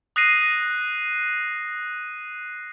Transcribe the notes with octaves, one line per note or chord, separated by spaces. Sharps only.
D#6 F#6 A#6 C7 D#7